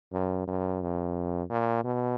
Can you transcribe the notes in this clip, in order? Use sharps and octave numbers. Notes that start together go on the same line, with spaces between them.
F#2
F#2
F2
A#2
B2